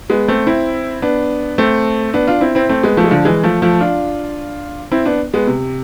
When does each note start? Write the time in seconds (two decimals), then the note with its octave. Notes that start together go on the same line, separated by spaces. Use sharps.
0.10 G#3 B3
0.28 A3 C4
0.47 C4 E4
1.02 B3 D4
1.58 A3 C4
2.14 B3 D4
2.27 D4 F4
2.41 C4 E4
2.55 C4 E4
2.69 A3 C4
2.83 G#3 B3
2.97 F3 A3
3.04 G#3
3.11 D3 F3
3.25 E3 G#3
3.43 F3 A3
3.62 F3 A3
3.80 D4 F4
4.92 C4 E4
5.06 B3 D4
5.34 G#3 B3
5.47 C3